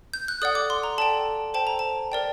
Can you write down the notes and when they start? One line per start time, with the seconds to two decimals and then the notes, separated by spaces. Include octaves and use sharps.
0.14 G6
0.28 F#6
0.42 A4 D5 F#5 D#6
0.55 D6
0.70 C6
0.83 A#5
0.98 A4 D5 G5 A5
1.54 A4 C5 G5 A5
1.67 A#5
1.79 A5
2.12 A#4 D5 G5